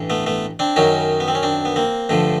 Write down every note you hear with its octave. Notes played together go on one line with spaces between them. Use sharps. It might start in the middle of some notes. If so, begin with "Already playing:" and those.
Already playing: A1 G2 E3
A3 B3
A3 B3
C4 D4
F#2 D#3 F#3 C#4 D#4
B3
C4
C#4
C4 D4
B3
A#3 C4
G2 D3 F3 A3